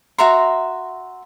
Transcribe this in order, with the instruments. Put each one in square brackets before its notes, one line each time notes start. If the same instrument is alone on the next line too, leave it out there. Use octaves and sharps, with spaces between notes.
[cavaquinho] F#4 E5 A#5 C6